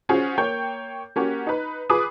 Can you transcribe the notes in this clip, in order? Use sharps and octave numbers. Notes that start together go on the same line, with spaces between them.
C#4 F4 F#4 G#4 C5
A#3 C#5 G5 G6
A#3 C#4 F#4 G4
D#4 B4
F4 G#4 B4 D6 D#6